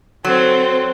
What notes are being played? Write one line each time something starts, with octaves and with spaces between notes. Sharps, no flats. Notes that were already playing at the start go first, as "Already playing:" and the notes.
F#3 C4 A4